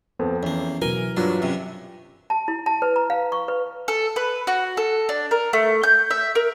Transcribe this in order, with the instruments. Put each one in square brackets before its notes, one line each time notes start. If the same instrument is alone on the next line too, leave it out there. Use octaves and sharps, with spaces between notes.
[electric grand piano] F2 [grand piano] B3 C4 A4
[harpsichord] E2 A#3 [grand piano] C#4
[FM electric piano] B2 F#3 [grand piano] E3 F6 G7 [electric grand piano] A#4 [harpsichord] G#5
[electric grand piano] G2 F#3 B4 [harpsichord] D4 [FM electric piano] F4
[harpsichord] F#2 C3
[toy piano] A5
E4
A5
B4
A#5
F5
C#6
B4
[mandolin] A4
B4
F#4
A4
D4
A#4
A3
G6
E5
A#4